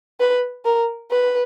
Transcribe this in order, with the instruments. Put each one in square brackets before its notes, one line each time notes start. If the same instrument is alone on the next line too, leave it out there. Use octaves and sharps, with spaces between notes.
[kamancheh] B4
A#4
B4